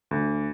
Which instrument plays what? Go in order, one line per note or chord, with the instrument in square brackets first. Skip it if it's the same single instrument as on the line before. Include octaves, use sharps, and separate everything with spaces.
[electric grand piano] D2